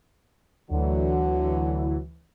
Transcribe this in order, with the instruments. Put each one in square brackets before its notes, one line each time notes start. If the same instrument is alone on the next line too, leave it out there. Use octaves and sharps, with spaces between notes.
[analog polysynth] D2 E3 [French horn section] D3 F#3 F#4